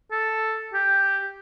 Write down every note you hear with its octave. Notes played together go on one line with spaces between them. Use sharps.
A4
G4